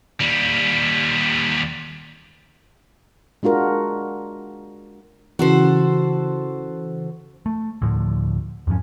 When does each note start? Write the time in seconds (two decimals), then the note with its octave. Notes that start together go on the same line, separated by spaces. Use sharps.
0.20 D#2 G3
3.43 G#3 D4 F4 F#4 A#4
5.39 C#3 E3 F#4 A4 C5
7.46 A3
7.82 D2 A2 F3
8.67 F2 G#2 F3 C#4